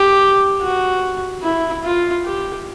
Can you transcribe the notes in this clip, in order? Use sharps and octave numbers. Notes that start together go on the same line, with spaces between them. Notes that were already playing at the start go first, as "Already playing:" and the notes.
Already playing: G4
F#4
E4
F4
G4